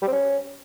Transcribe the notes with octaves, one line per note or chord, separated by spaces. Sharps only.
G3
C4
C#4